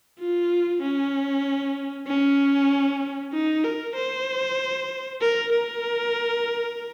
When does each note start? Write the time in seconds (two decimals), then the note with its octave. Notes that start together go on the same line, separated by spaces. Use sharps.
0.20 F4
0.82 C#4
2.07 C#4
3.33 D#4
3.64 A#4
3.96 C5
5.21 A#4
5.52 A#4